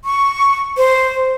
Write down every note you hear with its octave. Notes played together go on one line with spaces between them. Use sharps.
C#6
C5